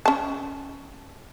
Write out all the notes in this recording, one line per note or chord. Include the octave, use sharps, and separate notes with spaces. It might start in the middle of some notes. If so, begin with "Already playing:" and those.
C#4 A5